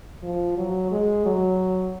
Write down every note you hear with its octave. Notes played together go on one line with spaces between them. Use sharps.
F3
F#3
G#3
F#3